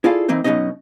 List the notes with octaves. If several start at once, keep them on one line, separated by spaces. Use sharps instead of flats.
E4 F4 G#4 A4 D5 F5
E3 A#3 C4 D#4 C5
F#2 B2 G3 C#4 D#4 D#5